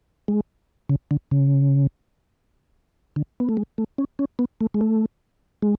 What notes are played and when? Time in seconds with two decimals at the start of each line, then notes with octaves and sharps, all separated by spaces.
0.28 G#3
0.89 C#3
1.11 D3
1.31 C#3
3.16 D3
3.40 B3
3.49 A3
3.57 G#3
3.78 A3
3.98 C#4
4.19 C#4
4.39 B3
4.61 A3
4.74 G#3
4.81 A3
5.62 G#3